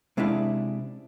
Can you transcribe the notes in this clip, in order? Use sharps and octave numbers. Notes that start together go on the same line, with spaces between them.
C3 G#3 C#4 D4 E4 F5